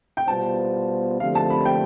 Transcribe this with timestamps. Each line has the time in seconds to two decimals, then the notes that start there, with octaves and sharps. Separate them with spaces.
0.17 G5
0.27 B2 G3 B3 F4 C5 A5
1.20 D3 F3 A3 C4 G4 F5
1.35 A5
1.50 B5
1.65 G5